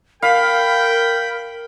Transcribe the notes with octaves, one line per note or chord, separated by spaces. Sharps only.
A#4 F5 G5 B5